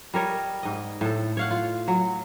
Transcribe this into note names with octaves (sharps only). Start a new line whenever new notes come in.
G3 A#4 C#5 D#5
G#2 D#5
A2 A4
C#5 F5 F#5
F4
F#3